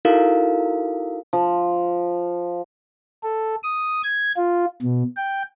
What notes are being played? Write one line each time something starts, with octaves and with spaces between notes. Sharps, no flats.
D#4 E4 F#4 A4 A#4 F5
F3
A4
D#6
G#6
F4
B2
G5